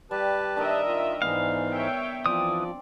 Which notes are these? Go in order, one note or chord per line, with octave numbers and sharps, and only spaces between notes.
G3 G4 B4 A5
D#3 D4 A#4 D#5 E5
F4
G#2 E3 G#3 B3 F5
C#5 E5 G5
E3 F3 C4 D5 D#6